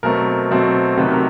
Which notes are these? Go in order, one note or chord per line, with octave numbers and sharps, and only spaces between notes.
B2 F#3 A3 C4 A#4
B2 F#3 A3 C4
C3 D#3 F#3 A3 B4
A#4